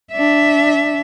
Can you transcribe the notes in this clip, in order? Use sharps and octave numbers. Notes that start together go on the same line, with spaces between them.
D4 E5